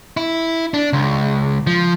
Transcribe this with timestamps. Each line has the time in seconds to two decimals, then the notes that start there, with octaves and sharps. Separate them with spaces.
0.17 E4
0.74 D4
0.93 C#2
1.67 F3